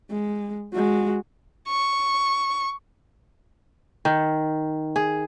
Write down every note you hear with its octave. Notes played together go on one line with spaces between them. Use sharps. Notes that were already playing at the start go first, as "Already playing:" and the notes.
G#3
G#3 F#4
C#6
D#3
G#4